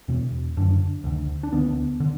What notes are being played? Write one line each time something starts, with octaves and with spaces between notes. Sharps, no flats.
E2 B2
F#2 D3 D4
D2 D3
D4
D2 D3 B3
D3